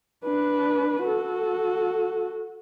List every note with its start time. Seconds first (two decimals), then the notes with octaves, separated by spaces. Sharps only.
0.25 D4 B4
1.04 F#4 A4